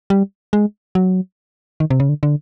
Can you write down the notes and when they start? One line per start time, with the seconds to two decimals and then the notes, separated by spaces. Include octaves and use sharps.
0.10 G3
0.53 G#3
0.95 F#3
1.80 D#3
1.90 C3
2.00 C#3
2.09 D3
2.23 D3